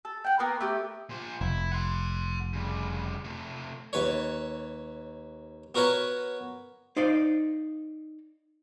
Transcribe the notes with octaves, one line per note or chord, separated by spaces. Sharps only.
A4
F#5 G5
A#3 B3 A#4
A3 G4
A#2 C5
F1 E4
F#5 C6
C#3 G3
C3 A3
D#2 B4 C#5
B3 F#4 A#4 B4 C#5
D#4 C5 D5 F5